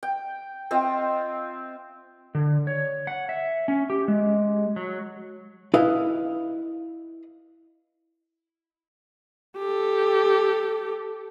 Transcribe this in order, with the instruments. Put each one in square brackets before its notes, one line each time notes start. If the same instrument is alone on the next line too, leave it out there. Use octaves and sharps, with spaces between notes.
[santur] G5
C4 F4 D#5 E5
[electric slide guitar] D3
C#5
F#5
E5
C#4
G4
G#3
F#3
[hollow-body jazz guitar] E4 B4 D#5 F5
[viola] G4 A4